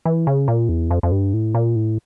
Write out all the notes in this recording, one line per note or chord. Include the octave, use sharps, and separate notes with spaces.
E3
C#3
A#2
E2
F2
F2
G2
A2
A#2
A2